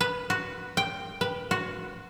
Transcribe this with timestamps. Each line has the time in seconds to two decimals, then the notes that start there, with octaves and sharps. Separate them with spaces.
0.01 B4
0.30 F#4
0.77 G5
1.21 B4
1.51 F#4